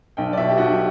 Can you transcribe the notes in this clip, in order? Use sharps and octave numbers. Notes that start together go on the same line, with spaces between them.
B1 G5
D5
B2 E5
G4
B1 F#4